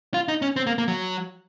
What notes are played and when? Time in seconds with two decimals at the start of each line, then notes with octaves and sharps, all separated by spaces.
0.14 F4
0.28 D#4
0.42 C#4
0.56 C4
0.67 A#3
0.78 A#3
0.88 F#3